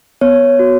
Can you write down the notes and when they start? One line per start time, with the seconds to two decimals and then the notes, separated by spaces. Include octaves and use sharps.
0.21 B3 C#5
0.59 F#4